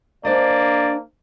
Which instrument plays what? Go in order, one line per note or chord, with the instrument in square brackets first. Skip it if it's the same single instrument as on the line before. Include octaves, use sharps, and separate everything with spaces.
[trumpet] A#3 [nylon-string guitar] D4 C5 D#5 [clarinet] D5